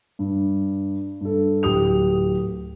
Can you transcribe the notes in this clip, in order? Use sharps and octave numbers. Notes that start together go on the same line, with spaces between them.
G2
G2 A4
D1 G4 D#6 F7